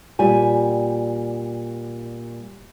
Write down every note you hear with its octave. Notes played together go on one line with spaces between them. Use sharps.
A#2 G3 G#5